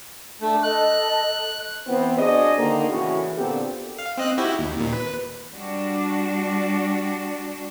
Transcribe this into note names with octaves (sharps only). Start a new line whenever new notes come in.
A3 D4
A4 D#5 F#6
E3 B3 C4
D4 F#4 G#4 C5 D5 D#5
D3 D#3 A#3
A2 C#3 E3 F#4
A#2 D3 B3 C4 G4 A4
F5
C4 D#5 F#6
E4 F#4 G4
D#2
D#2 A#2
B4
G3 D4 F#4